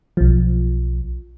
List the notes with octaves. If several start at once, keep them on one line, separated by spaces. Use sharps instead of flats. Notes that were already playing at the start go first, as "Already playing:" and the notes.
B1 F3